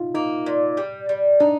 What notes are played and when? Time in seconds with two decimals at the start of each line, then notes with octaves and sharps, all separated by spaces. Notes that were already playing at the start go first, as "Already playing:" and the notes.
Already playing: D#4 F4
0.14 A#3 D#4
0.46 A#2
0.77 G3
1.09 G3
1.40 D4 D#4